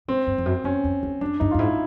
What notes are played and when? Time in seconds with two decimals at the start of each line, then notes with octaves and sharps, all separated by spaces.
0.08 G#2 C4
0.27 G2
0.38 F2
0.46 F#2
0.64 F#2 C#4
0.84 F2
1.03 E2
1.21 F#2 D4
1.40 G2 D#4
1.51 F4
1.54 G2
1.59 G#2 E4